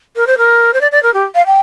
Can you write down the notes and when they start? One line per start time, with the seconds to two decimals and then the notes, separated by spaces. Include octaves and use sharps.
0.16 A#4
0.27 C5
0.38 A#4
0.73 C5
0.81 D5
0.91 D5
1.03 A#4
1.14 G4
1.35 F5
1.46 G5